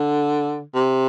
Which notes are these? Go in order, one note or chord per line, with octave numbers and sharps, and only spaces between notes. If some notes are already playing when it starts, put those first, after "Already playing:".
Already playing: D3
C3